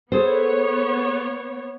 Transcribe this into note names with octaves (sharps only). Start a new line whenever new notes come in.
B3 G#4 A4 C5 C#5